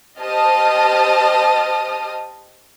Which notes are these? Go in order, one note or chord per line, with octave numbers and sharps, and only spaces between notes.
G4 C5 D#5 A5 D#6 F6